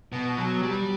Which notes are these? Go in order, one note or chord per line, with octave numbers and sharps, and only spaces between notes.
B2
F#3
G3